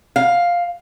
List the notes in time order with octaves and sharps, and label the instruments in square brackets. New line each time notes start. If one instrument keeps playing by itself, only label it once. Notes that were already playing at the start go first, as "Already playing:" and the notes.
[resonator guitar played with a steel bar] F5